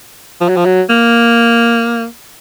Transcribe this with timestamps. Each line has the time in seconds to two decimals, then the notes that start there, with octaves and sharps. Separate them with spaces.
0.41 F3
0.48 F#3
0.57 F3
0.65 F#3
0.89 A#3